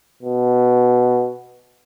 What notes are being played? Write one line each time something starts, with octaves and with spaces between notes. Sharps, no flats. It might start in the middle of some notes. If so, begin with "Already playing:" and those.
B2